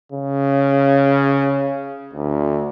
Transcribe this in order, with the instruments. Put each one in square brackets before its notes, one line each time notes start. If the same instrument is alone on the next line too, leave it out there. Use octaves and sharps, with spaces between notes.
[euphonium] C#3
D2